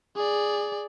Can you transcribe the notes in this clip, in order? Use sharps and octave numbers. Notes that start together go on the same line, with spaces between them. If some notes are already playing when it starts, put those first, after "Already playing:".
G#4 D5